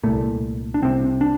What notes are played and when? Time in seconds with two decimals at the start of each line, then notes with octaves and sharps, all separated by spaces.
0.03 C2 A#2 A3
0.74 D4
0.82 C2 C3 C4
1.21 D4